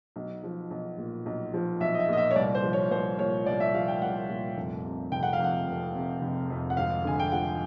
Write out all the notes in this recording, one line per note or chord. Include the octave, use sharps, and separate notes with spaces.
B1
F3
B1
A#2
B1
F3
B1 E5
D#5
E5
A#2 D#5
E5
C#5
C2 D5
C5
F3
C#5
C2 C5
A#2 C#5
C2 D5
E5
F3 F5
G5
C2 F#5
A#2
F1
C3
F1 G5
F#5
F5
F2
F#5
F1
C3
F1
F2
F#5
G#1 F5
D3 G#5
G5
F3 F#5